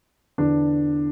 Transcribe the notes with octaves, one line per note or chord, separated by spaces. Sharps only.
E2 D3 D4